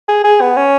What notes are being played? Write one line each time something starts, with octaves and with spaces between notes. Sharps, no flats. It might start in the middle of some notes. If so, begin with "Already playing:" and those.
G#4
G#4
B3
C#4